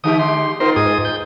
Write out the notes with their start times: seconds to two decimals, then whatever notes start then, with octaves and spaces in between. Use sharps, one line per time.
0.04 D3 G#3 G4 D#6
0.19 C6
0.60 B3 D#4 F4 A#4 C5 C6
0.76 G#2 G#4 D#6
1.05 G6